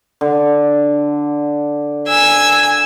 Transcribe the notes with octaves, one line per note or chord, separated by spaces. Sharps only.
D3
G#5 E6